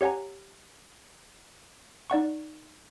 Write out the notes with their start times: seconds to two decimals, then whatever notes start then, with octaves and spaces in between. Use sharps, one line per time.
0.01 G4 C#5 F#5 G#5 A#5
2.10 D#4 D5 F#5 C#6